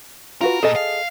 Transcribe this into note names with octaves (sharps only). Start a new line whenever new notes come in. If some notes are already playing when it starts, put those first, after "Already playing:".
F4 F#4 A#4 B4
A#2 G#4 A4 D#5
F5